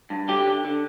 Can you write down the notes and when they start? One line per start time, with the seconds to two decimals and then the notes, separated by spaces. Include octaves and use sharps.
0.10 G2
0.28 D3 G4
0.47 D3
0.65 D3